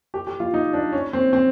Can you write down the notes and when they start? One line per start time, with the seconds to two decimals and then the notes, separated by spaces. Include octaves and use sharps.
0.14 G4
0.27 G4
0.40 F4
0.54 D#4
0.73 D4
0.93 C#4
1.13 C4
1.33 C4